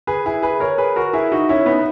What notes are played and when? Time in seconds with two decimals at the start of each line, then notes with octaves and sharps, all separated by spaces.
0.07 G#4 B4
0.26 E4 G#4
0.43 G#4 B4
0.60 A#4 C#5
0.78 G#4 B4
0.96 F#4 A#4
1.13 E4 G#4
1.32 D#4 F#4
1.49 C#4 E4
1.66 B3 D#4